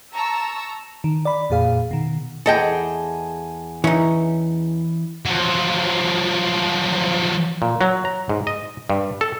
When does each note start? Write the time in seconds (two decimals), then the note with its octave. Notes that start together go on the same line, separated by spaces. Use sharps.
0.14 A5 A#5 C#6 E6
1.04 D#3
1.25 D5 B5
1.50 F2 A#2 G#4 F5
1.91 B2 D#3
2.46 E2 G#4 A4 D#5 G5 A5
3.84 E3 C#4 D#4
5.25 F3 F#3
7.62 A#2
7.81 F#3
8.05 A#5
8.29 G#2
8.47 D#5
8.90 G2
9.21 A4